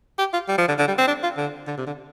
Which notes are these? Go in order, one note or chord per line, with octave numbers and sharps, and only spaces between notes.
G4
F4
G3
F3
D3
D3
G3
C4
D4
F4
D3
D3
C3
D3